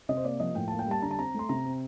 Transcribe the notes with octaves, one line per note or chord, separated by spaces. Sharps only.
C3 D#5
C5
A#3 D5
F3 D#5
A2 G5
A#3 A5
G5
G3 A5
D3 A#5
A5
C4 A#5
A3 C6
C3 A#5
C4